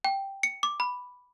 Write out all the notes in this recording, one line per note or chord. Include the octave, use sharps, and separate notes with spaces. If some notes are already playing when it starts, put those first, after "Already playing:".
G5
C#7
D6
B5